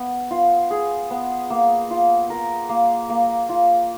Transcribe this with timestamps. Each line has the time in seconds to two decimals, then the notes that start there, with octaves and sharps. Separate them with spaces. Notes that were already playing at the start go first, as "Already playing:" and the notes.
Already playing: B3
0.31 F4
0.71 G#4
1.10 B3
1.50 A#3
1.91 F4
2.30 A#4
2.69 A#3
3.10 A#3
3.49 F4